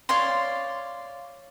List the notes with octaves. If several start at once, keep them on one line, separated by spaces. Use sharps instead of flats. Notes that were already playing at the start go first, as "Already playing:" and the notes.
C#5 D5 F5 C6